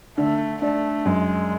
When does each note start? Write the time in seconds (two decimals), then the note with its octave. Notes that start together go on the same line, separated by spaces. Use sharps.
0.18 D3 A3
0.62 A3 D4
1.05 F#2 G#3